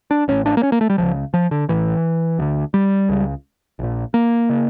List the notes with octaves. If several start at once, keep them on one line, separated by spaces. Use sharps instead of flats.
D4
A1 A2 C#4
D4
A#3
C#4
A#3
A3
G3
C#2 C#3 F3
F3
D3
A1 A2 E3
D2 D3
G3
C#2 C#3
A#1 A#2
A#3
C#3